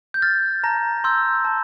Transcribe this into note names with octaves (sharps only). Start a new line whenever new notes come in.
G6
F6 A6
A5 A#5 A#6
C6 E6 G6
A5